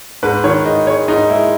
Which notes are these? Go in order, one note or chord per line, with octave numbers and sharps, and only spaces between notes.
G#2 B4
D#3 C#5
G#2 D#5
G#3 C#5
G#2 D#4
G#3 E4